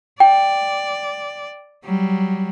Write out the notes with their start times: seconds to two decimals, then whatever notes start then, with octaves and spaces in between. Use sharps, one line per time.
0.20 D5 G5
1.84 F#3 G3